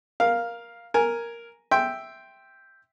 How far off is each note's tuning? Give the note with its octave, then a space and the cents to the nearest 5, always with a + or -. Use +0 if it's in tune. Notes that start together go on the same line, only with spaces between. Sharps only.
A#4 +15 F5 +0
A#4 +0 G#5 +0
E5 +0 G5 +0 C6 +0